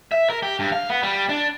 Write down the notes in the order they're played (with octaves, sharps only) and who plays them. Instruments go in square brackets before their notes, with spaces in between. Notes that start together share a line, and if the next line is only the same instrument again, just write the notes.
[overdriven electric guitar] E5
A#4
G4
G2
F5
B3
G3
D4